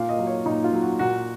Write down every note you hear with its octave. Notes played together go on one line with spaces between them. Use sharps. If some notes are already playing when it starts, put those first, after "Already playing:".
Already playing: A#2 F5
D#5
F#3
C#5
A#2 D#4
F4
F#3
F#4
A#2 F#4